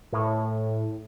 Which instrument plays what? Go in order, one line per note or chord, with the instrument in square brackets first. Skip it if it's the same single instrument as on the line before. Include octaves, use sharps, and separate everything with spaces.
[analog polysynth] A2